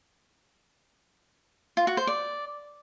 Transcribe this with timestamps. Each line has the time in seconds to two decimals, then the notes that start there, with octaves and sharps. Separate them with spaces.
1.77 F4
1.87 F#4
1.97 C5
2.07 D5